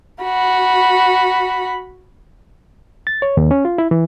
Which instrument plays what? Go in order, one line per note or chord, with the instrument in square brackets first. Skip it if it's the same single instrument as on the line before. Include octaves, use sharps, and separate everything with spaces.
[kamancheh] F#4 B5
[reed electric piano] A6
C#5
D#2
C#4
F4
E4
E3